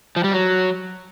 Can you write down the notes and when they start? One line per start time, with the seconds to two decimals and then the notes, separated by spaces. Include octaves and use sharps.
0.16 F3
0.24 G3
0.32 F#3